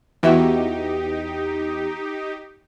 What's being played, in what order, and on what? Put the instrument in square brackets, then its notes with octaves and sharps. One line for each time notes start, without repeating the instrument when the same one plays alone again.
[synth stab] E2 [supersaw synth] D#4 G4 [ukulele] F#4 E5 G5